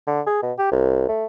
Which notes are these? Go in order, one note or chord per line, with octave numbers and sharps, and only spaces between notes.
D3
G#4
B2
G4
C2
A3